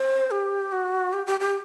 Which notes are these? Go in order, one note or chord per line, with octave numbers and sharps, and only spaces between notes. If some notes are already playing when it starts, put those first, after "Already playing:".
Already playing: C5
G4
F#4
G4
G4
G4